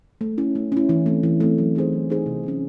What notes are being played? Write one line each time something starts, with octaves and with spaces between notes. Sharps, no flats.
A3
C#4 E4
A3
C#4 E4
E3
A3 C4
E3
A3 C4
F#3
C4 D#4 G#4 C5
F#3
C4 D#4 G#4 C5
C3
F#3 A3 C#4